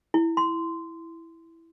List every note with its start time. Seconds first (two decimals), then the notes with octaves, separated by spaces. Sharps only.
0.14 E4
0.37 C6